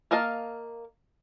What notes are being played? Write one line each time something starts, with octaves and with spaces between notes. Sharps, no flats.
A#3 A#4 D#5 F5 A5